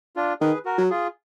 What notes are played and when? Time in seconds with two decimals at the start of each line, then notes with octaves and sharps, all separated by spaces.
0.16 D4 F4
0.41 D#3 G#4 B4
0.65 F#4 A#4
0.78 F#3
0.90 F4 G#4